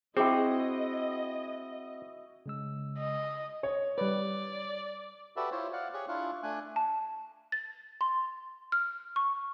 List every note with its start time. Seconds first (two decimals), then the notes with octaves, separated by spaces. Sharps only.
0.17 C4 E4 F#4 G#4 D#5 G5
2.46 C#3 G#3 E6
2.98 D#5
3.63 C#5
3.98 G3 B4 D5
5.37 F#4 G4 A4 B4 D5 E5
5.52 E4 F4 C5 C#5
5.73 D5 F5 F#5
5.94 G4 G#4 C#5 C#6 F#6
6.08 D4 E4 F4 F5 C#6 F#6
6.43 A3 D4 G#5 F#6
6.76 A5
7.52 A6
8.01 C6
8.72 F6
9.16 C#6